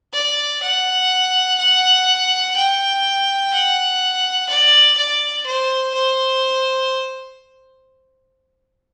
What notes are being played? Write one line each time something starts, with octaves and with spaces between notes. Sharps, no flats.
D5
F#5
F#5
G5
F#5
D5
D5
C5
C5